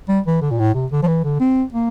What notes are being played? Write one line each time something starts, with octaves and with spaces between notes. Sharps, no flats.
G3
E3
D3
A#2
A2
C3
D3
F3
E3
D3
C4
A#3